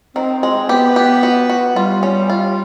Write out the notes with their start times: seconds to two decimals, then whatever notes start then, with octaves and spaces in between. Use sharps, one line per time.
0.15 D#3 C4
0.43 G#3
0.69 B3 G4
0.96 G4
1.23 F#4
1.50 F#4
1.76 G3 F4
2.03 C#4
2.30 F4